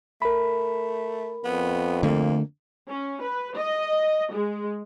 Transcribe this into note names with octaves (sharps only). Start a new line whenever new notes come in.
A3 A#4 B5
F2 B3
D3 A3 A#3
C#4
B4
D#5
G#3